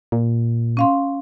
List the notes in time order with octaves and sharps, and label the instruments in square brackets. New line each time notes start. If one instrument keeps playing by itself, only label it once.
[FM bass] A#2
[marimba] C#4 F5 C6